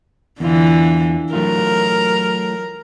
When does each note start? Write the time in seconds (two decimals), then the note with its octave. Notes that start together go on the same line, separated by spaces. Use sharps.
0.40 E2 D3 E3 F4
1.33 F#3 A3 F4 A#4